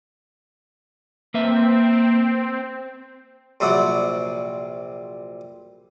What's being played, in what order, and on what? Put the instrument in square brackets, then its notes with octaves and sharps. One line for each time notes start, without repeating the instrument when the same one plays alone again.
[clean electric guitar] A#3 B4 E5 [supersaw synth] C4
[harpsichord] A#1 C3 F#3 G3 F#5